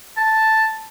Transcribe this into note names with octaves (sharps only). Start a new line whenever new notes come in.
A5